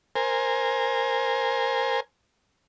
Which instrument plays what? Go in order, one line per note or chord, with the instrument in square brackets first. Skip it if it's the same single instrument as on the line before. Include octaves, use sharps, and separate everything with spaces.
[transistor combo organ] A#4 C5 G#5